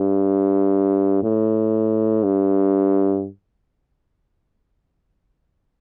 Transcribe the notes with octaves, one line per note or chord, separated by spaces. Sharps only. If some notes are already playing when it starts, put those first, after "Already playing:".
Already playing: G2
A2
G2